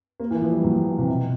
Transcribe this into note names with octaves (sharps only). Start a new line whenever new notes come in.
A#3
E3
F3
G3
F#3
F3
E3
C3
B2